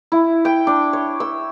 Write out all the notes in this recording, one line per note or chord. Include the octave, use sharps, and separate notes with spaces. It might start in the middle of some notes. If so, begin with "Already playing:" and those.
E4
G5
D4
C#5
E6